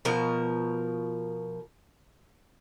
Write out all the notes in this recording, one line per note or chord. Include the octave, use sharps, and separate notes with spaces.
B2 F3 A#4